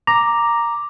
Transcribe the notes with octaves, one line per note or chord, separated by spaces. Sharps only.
A#5 D6